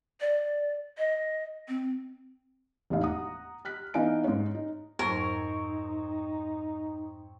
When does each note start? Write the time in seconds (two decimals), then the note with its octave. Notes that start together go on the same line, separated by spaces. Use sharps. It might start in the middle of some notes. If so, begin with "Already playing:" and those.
0.21 D5
0.98 D#5
1.68 C4
2.90 E1 D#2 A2 F5
3.03 F#5 A#5 D#6
3.65 F6 F#6 B6
3.94 E3 B3 D#4 F5 G#5 D7
4.24 G#2 C#5
4.55 D#4
4.99 F2 G#2 F#3 C4 D#4 A#4 C#5